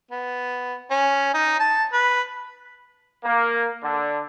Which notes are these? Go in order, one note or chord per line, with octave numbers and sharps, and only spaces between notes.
B3
C#4
D#4
A5
B4
A#3
D3